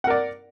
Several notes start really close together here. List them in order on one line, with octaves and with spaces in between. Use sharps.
F#5 A#4 D5